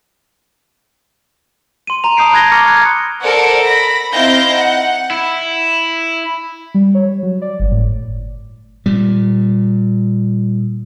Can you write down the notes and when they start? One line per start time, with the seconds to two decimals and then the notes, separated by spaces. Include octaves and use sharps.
1.87 C6 D#7
2.04 A#5 C6 F7
2.17 A5 A#5 D#6 G6 C7 D7
2.32 B5 F#6 G#6 A#6 G7
2.52 C#6 D6 F6 A#6 C#7
2.67 D6 F#6 G#6 C#7
3.21 A4 A#4 C5 D5 F#5
3.61 B5 A#6
4.12 C4 D#4 E4 F5 G6 A#6
4.55 F#5
5.11 E4
6.74 G3
6.95 C#5
7.23 F#3
7.42 D5
7.60 G1
7.71 A2
8.86 A#2 G3